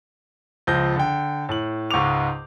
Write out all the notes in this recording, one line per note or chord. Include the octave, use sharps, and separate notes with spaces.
C#2 F3 G6 A#6
D3 G5
A2 F#7
C#2 G#2 C#6 D6 F7